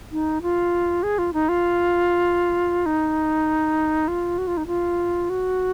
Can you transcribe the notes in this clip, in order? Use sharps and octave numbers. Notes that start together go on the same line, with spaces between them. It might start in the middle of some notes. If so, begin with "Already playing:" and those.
D#4
F4
G#4
F4
D#4
F4
D#4
F4
F#4
F4
D#4
F4
F#4